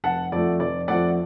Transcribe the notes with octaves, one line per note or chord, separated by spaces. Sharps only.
F1 F#5 A5
F2 F3 A3 D5
F1 D5
F2 F3 A3 D5 F#5